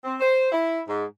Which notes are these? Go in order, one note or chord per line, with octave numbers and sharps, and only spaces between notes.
C4
C5
E4
G#2